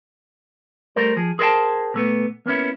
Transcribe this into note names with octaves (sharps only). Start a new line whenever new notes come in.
G3 A3 A#4 C5
F3 G#4
G#4 A#4 C5 D5 G5 A5
A#2 A3 B3
A#3 B3 C#4 E4